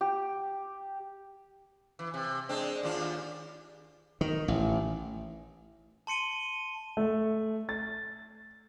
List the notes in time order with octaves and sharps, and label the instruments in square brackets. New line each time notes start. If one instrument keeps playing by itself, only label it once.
[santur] G4
[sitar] E3
C3
G#3 C4 D4
D#2 D4 F4
[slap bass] D#3
A1
[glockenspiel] A5 C6 C#7 D#7 G7
[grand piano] A3
A6